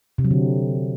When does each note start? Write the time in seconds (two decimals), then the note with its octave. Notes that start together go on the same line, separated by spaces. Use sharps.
0.18 C3
0.24 F#3
0.31 D3